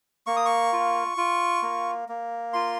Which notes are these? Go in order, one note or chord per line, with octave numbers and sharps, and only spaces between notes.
A#3 C#6
D#6
C#6
F4
F4
A#3
A#3
F4 C6